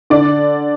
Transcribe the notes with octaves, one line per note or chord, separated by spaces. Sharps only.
D3 D5